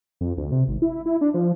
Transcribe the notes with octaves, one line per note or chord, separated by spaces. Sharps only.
F2
D2
C3
G#1
E4
E4
D4
F3